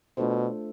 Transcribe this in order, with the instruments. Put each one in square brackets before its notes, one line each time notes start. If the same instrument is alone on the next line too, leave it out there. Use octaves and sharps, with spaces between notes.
[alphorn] B2 [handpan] A3 D4 F4 A4 C5